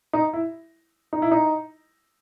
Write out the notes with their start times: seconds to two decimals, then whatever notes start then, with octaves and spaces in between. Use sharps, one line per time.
0.13 D#4
0.33 E4
1.13 D#4
1.22 E4
1.31 D#4